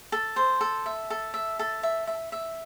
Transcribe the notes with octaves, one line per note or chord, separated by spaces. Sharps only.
A4
C5
A4
E5
A4
E5
A4
E5
E5
E5